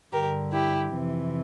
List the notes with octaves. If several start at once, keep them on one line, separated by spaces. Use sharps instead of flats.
G2 D3 G4 A#4
E4 G4
F2 C3 E3